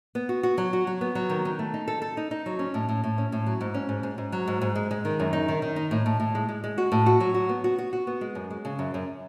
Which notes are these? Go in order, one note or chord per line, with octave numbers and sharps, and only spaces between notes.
B3
F#4
F#4
F#3
F#4
F#3
B3
F#3
D#3
D#3
A3
D#4
A4
A4
D#4
D#4
F#3
C#4
A2
A2
A2
C#4
A2
F#3
G#2
C#4
G#2
G#2
G#2
F#3
G#2
G#2
G#3
G#3
D#3
F#2
D#4
D#3
D#3
D#4
A2
A2
A2
G#3
G#3
G#3
F#4
A2
F#4
F#3
F#4
B3
F#4
F#4
F#4
B3
G#3
F#2
G#3
C#3
F#2
F#2